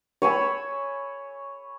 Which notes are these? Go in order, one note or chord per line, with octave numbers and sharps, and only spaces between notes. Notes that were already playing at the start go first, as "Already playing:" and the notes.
C#5 G#5 B5 E6